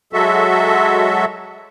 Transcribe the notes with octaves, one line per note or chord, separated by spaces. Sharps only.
F#3 G#3 F#4 A4 E5